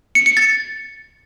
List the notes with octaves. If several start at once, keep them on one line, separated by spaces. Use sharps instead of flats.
C#7
C#7
A6